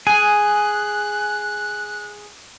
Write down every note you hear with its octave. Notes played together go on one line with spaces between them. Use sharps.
G#4 G#5 F#6